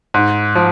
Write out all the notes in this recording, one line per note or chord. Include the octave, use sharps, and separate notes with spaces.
G#2
F3